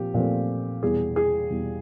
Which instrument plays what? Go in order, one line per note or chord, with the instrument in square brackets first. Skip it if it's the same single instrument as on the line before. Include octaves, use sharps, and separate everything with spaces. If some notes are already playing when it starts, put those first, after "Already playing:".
Already playing: [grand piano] A#2 F3 C4 [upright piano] G4
[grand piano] A#2 F3 A3 C4
[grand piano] E2 B2 G3 [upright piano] G#4
[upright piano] G#4
[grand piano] E2 B2 G3